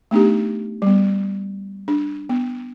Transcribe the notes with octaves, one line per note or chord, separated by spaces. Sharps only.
A3 B3 D4 D#4 G4
G3 B3
D4
B3